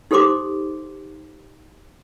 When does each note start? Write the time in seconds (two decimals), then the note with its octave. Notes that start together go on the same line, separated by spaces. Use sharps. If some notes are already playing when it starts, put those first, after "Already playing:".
0.11 D#4 G4 A4 C5 C6 D6